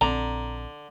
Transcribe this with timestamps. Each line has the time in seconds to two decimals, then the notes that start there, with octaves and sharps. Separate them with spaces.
0.01 A#1 D3 C4 A#5